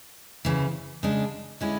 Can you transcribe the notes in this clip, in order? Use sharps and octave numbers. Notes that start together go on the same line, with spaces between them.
D2 C#3 E3
C#3 G#3 D4
D3 G#3 C#4 E4